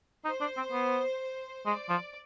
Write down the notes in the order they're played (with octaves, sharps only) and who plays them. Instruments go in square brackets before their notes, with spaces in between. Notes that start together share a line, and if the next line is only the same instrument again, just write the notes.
[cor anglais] D#4 [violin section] C5
[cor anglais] D4
C4
B3
[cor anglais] G#3 [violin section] D5
[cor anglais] F3